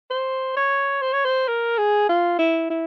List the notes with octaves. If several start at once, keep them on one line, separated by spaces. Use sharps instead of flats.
C5
C#5
C5
C#5
C5
A#4
G#4
F4
E4
E4